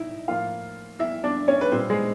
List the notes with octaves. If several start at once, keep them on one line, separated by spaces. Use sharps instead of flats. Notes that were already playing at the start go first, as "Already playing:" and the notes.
Already playing: D#4 E4 E5
A2 F3 A#3 F4 F5
E4 E5
D4 D5
C#4 C#5
B4
A#2 G3 C4 C5
G#3 G#4